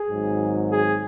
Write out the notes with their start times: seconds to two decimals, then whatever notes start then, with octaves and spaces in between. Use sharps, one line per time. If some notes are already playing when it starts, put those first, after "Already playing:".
Already playing: G#4
0.09 G#1 G#2 F#3
0.69 G#4